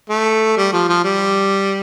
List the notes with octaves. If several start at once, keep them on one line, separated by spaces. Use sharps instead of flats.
A3
G3
F3
F3
G3